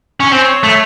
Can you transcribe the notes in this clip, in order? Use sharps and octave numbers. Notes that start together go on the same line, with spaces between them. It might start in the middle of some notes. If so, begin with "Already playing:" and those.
C#4
C4 C#5
A3